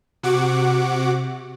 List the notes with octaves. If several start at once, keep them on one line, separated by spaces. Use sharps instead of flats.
C3 F#4 F#5 D6